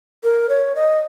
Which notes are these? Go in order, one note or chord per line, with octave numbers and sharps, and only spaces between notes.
A#4
C#5
D#5